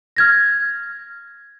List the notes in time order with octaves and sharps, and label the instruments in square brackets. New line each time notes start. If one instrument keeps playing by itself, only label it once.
[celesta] F6 G#6 A#6